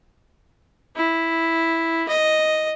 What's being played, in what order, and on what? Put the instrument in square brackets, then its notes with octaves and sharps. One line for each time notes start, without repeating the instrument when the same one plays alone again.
[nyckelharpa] E4
D#5